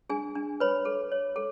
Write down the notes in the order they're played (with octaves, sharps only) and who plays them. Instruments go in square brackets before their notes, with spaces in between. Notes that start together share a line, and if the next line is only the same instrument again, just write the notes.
[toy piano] D4 G#4 G#5
D4
B4 C#5 B5
A4
C#5
A4